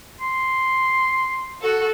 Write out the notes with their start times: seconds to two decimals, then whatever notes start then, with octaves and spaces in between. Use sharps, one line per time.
0.20 C6
1.61 F#4 A4